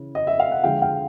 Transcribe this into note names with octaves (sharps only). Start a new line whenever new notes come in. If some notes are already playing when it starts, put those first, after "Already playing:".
Already playing: C#3 E3
D#5
E5
F5
F#5
D3 F3 G#3 F5 G5
F5 G5